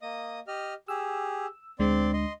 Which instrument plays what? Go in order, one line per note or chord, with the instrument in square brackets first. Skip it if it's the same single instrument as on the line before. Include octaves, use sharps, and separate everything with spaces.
[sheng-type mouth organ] A#3 D#5 D#6
G4 D#5 F6
[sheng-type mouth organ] G4 G#4 [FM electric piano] E6
[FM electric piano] D2 G#3 D4 [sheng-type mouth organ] C4 D5 C6
[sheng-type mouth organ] D#5 C6